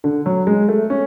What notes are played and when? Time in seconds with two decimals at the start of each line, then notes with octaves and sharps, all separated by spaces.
0.04 D3
0.26 F#3
0.47 G#3
0.69 A3
0.90 C#4